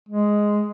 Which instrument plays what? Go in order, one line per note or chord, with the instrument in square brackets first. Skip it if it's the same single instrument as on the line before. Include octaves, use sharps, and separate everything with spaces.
[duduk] G#3